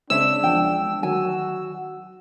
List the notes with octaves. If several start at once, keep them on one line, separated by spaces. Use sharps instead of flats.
C#3 G#3 C4 D4 C#5 E5 E6
E2 F3 G#3 G5
D2 D#3 F#3 F#4 G#5